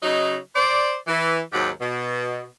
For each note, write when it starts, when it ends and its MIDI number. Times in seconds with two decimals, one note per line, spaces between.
0.03 0.36 49
0.03 0.36 54
0.03 0.36 63
0.55 0.95 72
0.55 0.95 74
1.07 1.39 52
1.53 1.69 39
1.53 1.69 44
1.53 1.69 54
1.53 1.69 67
1.80 2.44 47